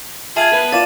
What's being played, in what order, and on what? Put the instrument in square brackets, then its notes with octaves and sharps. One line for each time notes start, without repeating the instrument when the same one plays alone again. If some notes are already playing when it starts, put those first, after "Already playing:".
[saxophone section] F4 G#4 [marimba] E5 G#6 [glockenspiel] A5 D#7 F#7
[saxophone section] B3 [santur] B4
[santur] F4 D5 F5 [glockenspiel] A6 D#7 E7